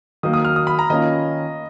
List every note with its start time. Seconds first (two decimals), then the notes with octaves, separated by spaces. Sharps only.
0.23 D#3 F#3 A#3 D#6
0.34 D#6
0.45 F6
0.56 D#6
0.67 B5
0.79 A#5
0.90 D#3 A#3 C#4 F4 D#5